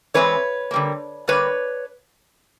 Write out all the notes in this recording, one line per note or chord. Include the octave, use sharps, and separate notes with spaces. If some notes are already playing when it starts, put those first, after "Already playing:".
E3 G#3 C4 B4 C#5
D3 G3 A#3
D3 G3 A#3 B4 C#5